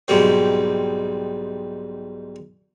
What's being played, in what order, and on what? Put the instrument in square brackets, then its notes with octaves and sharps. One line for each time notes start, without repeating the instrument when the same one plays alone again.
[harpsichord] B1 G#2 G3 C4